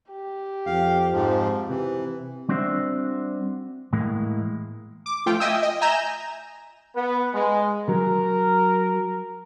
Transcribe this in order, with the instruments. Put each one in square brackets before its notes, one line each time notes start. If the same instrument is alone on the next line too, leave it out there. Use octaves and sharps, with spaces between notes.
[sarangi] G4
[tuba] F2 [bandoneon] F5
[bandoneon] G#2 F3
[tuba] C3 [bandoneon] E3
[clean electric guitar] G3 C4 D4 F#4 C5 E5
A2 E3 G#3 A#3
[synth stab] D6
F3 A3 F4 G5
D#5 E5 G5 G#5 D#6 E6
D#5
E5 G#5 A#5 G6 E7
[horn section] B3
G#3
[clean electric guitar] F#3 [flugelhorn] A#4